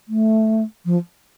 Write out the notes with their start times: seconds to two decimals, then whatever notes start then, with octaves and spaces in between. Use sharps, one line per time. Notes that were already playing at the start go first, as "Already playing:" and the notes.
0.08 A3
0.85 F3